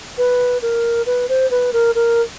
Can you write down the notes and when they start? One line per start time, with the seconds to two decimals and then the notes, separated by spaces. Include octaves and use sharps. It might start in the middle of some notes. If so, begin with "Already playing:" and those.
0.18 B4
0.62 A#4
1.06 B4
1.29 C5
1.51 B4
1.73 A#4
1.95 A#4